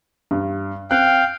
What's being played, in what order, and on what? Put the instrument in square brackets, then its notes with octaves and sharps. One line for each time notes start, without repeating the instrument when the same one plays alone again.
[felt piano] G2
[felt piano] C4 F#6 [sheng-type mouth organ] F5 G5